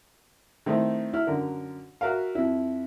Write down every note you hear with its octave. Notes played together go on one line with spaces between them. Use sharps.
D#3 A3 C4 D#4 E4
E4 F6
F#2 D3 A#4
F#4 A#4 E5 F5
F2 E4